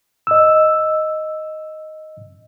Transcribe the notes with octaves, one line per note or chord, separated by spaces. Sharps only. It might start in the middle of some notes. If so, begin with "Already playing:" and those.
D#5 E6